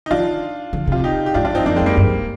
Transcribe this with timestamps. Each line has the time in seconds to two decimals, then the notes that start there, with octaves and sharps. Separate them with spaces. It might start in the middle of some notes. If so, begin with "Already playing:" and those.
0.06 D#4
0.11 D#3 D4 F4
0.73 D3
0.88 C3 F4
1.04 D#4 G4
1.26 G4
1.34 G#2 D4 F4
1.45 D4 F4
1.51 G2
1.55 C4 D#4
1.66 F2 A#3 D4
1.76 G#3 C4
1.81 F2
1.86 G3 A#3
1.97 G2